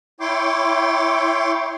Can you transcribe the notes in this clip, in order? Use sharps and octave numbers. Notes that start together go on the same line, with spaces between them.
E4 C#5 G5 C6 D6